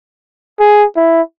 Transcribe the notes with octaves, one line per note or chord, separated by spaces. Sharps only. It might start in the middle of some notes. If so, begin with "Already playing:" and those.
G#4
E4